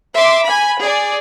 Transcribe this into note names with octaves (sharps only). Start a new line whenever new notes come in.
E5 C6 D6
G#5 B5
G#4 D5